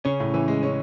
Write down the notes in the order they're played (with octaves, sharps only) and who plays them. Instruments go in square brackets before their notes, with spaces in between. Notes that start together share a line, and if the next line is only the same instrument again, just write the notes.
[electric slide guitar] C#3 [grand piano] C#4
[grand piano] A2
E3
G#3
C#4